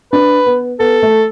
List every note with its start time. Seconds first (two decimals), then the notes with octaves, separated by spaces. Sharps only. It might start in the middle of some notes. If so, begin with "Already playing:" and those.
0.13 D4 B4
0.46 B3
0.80 B3 A4
1.03 A3